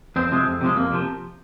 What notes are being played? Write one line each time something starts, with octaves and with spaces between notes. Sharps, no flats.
F2 C4
C3 F3 G#3
F2
C3 F3 G#3
F2 A#3
C3 F3